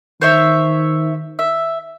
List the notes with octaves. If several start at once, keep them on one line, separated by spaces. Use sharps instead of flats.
D#3 C5 C#5 E5
E5